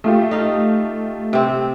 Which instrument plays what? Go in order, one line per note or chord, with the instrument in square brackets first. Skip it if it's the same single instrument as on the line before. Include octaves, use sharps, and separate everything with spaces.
[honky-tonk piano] A3 F4 G4
[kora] D#4 F5
C3 C4